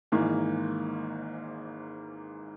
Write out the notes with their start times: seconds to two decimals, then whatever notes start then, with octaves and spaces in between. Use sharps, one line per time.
0.12 G#1 G#2 E3 A#3